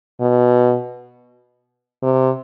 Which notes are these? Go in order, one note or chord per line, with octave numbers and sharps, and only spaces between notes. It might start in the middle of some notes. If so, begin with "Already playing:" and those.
B2
C3